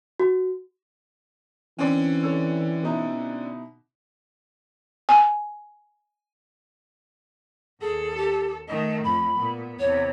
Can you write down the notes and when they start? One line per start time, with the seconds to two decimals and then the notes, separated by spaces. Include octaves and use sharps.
0.20 F#4
1.79 D3 E3 C4 C#4
2.23 A4 C#5 E6
2.83 B2 D#4 E4
5.09 G#5
7.81 D#2 G#4 A4
8.17 G4
8.68 D#3 A3 D#5
9.04 F2 B5
9.35 A#2 B3
9.79 E2 C3 C#5